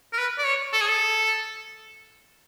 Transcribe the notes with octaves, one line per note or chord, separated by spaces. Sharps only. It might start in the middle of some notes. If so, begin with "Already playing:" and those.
A#4
B4
D5
C#5
A4
G#4
A4